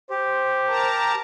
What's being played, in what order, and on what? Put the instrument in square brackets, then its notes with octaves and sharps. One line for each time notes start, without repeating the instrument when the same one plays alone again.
[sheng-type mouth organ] G4 [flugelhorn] C5
[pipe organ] A#4 A5 A#5